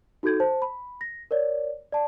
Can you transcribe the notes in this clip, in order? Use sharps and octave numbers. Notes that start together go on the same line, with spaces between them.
D#4 F#4 A4 G6 G#6
C5 A5
B5
A#6
A#4 C#5 D5
D5 A5